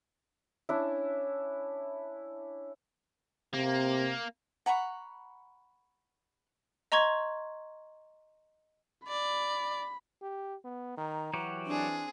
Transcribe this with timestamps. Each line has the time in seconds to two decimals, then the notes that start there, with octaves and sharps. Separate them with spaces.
0.69 C#4 D4 E4
3.54 C3 A#3
4.66 F#5 A#5 B5 C#6
6.92 D#5 A#5 C6 C#6 G#6
9.08 D5 B5
10.22 G4
10.65 B3
10.98 D#3 A#5
11.33 E3 F#3 F#4 G4
11.66 C4 D4 G#4